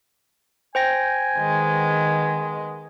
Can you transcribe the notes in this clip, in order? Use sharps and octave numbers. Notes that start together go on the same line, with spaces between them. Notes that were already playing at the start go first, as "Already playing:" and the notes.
C5 G5 G#5 A#6
D#3 G#3 B3